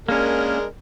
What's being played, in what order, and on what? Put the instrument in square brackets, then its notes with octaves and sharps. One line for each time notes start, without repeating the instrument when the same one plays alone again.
[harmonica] G#3 D4 A#4 [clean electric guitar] A#3 C#4